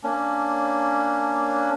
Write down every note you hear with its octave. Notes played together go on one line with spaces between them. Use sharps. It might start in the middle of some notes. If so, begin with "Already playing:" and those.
A#3 C#4 D4